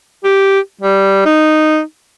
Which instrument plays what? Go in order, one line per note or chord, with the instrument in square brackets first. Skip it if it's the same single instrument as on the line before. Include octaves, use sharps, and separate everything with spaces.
[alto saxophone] G4
G3
D#4